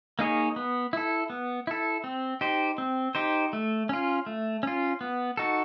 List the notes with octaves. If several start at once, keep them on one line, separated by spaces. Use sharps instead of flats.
A#3 D#4 G#4 C#5
B3
E4 A4
B3
E4 A4
C4
D#4 G4 C5
C4
D#4 G4 C5
A3
C#4 F4
A3
C#4 F4
B3
D#4 F#4 A4